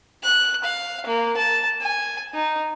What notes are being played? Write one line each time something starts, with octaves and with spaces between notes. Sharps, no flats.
F#6
F5
A#3
A5
G#5
D#4